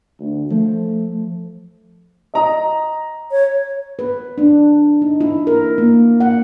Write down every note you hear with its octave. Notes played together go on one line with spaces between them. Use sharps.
D2
F3 A3
D#5 A#5 D#6
C#5
B4
D4
D#4
E4
A#4
A#3
F#5